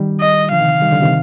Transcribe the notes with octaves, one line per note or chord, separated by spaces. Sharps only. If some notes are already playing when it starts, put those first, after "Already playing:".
Already playing: D#3 G3
D#5
D3 F3 F5
C3 D#3
D#3 G3
D3 F3
C3 D#3